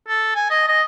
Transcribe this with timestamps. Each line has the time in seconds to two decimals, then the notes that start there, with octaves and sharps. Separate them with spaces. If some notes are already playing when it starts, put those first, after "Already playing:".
0.08 A4
0.35 G#5
0.50 D#5
0.68 D#5